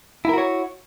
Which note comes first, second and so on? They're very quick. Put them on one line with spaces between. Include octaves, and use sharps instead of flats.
E4 A#4 F#4 C#5